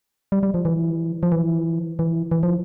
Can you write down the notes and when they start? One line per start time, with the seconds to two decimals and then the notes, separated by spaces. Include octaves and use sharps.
0.32 G3
0.43 G3
0.54 F3
0.65 E3
1.23 F3
1.32 E3
1.99 E3
2.31 E3
2.43 F3